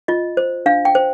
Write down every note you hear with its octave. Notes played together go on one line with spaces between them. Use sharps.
F4 D#5
C5
D4 F5
G5
C5